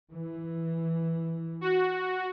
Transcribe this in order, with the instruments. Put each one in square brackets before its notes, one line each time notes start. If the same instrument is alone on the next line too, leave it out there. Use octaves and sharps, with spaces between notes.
[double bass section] E3
[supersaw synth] F#4